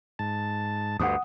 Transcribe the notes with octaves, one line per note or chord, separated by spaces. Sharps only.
G#2 A5
D2 G2 F#5 D#6